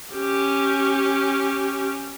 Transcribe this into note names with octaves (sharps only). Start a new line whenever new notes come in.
C#4 G4